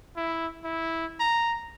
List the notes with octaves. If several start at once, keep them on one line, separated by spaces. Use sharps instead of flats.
E4
E4
A#5